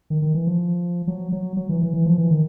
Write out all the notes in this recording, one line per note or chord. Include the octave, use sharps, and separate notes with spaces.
D#3
D#3
E3
F3
F#3
F#3
F#3
E3
E3
E3
F3
E3
D#3